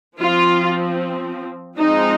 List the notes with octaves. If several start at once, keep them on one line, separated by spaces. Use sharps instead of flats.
F3 C4 F4
F3 G#3 C4 D#4